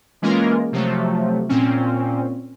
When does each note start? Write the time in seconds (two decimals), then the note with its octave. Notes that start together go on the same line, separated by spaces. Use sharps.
0.22 E3 G#3 A#3 C#4 F4 A#4
0.72 C3 F3 F#3 A3
1.49 A#2 C4 C#4